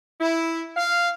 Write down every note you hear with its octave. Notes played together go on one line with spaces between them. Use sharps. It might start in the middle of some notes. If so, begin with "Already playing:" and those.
E4
F5